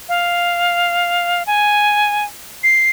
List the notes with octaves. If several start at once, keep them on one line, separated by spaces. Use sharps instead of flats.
F5
G#5
C7